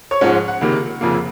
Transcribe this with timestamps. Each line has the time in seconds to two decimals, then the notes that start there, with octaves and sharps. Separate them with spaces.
0.11 C#5 C#6
0.21 G#2 F3 G#3 C#4 F#5
0.35 F#5
0.48 F#5
0.61 C#2 C3 D#3 A#3
1.01 F1 F2 C#3 F3 A#3